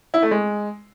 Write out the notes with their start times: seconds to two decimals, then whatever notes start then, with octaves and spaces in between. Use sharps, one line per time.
0.14 E4
0.22 A3
0.31 G#3